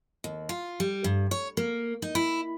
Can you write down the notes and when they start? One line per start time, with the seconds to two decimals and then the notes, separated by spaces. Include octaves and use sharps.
0.24 D#2
0.49 F4
0.80 G3
1.04 G2
1.31 C#5
1.57 A#3
2.02 D#4
2.15 E4